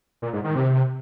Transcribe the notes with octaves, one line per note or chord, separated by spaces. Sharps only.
A#2
G#2
D#3
C3